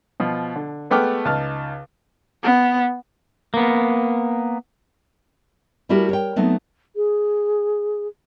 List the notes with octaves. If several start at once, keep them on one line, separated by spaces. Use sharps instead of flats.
B2 F3
D3
G#3 A3 B3 G5 D6 F6
C#2 D#4 A5 F6
B3
A#3 B3
G3 A3 E4 F#4 G4 A#4
A#4 C#5 G5
F#3 A3 B3 C4 D#4
G#4